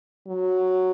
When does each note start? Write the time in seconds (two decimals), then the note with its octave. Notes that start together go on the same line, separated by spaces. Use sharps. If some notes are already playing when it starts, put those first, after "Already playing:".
0.27 F#3